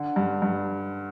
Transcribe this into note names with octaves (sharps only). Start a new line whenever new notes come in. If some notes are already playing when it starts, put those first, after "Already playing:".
Already playing: D3
G2
G2